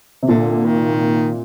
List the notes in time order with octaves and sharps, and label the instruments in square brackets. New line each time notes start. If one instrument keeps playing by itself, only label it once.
[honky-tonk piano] C3
[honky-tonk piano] A#2 [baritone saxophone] D3
[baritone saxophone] D#3